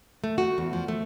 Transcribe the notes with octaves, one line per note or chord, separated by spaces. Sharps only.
A3
F#4
E2
F3
A3